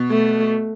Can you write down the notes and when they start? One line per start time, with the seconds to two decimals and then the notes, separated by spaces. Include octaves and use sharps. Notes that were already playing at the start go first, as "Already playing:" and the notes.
Already playing: B2
0.10 A3